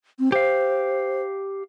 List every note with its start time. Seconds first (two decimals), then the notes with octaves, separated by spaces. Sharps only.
0.19 C4
0.32 G4 C5 F5